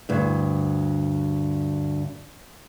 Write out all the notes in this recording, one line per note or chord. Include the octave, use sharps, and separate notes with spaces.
D2 G2